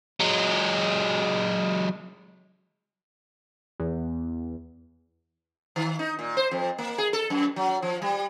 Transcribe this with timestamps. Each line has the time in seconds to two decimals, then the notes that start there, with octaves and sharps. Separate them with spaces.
0.20 F#3 G#3
3.80 E2
5.76 D#3
5.99 D#4
6.19 A#2
6.37 C5
6.51 F2
6.78 A#3
6.98 G#4
7.13 A4
7.30 F#2
7.56 F#3
7.82 F3
8.02 G3